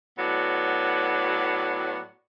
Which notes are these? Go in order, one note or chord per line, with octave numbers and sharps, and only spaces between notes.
A2 F#3 B3 F#4 D5